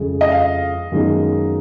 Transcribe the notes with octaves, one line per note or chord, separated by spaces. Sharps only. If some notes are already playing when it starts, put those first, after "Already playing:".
Already playing: F2 C#3 G#3
D#5
F5
F#2 D#3 G#3 B3 D#4